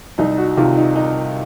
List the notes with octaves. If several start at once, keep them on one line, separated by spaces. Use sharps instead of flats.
C2 D#4
F#4
C3 D#3 F4
D#4
D#4